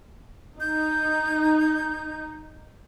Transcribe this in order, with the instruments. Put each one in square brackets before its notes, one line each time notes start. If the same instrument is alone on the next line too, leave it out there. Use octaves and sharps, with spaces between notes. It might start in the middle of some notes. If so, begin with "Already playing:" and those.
[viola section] D#4 [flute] G6